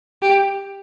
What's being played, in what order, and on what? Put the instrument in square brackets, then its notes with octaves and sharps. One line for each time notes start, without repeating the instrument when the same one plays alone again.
[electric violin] G4